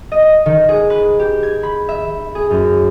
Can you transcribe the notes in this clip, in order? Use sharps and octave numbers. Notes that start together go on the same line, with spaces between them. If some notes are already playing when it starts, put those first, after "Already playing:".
D#5
D#3
G#4
B4
G4
G#6
B5
E5
G#4
F#2